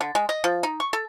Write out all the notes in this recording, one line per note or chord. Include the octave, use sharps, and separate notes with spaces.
D3
G#3
D#5
F3
D#4
C#6
A4